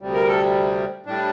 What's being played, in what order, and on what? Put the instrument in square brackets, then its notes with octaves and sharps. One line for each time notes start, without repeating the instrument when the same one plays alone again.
[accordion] D2 C3 G3
A#4
A4
A2 G3 D4